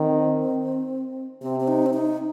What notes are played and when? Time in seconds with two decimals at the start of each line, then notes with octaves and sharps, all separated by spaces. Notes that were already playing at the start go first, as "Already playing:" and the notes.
Already playing: D#3 C4
1.42 C3 C4
1.60 C4
1.68 D#4
1.86 C4
1.94 D#4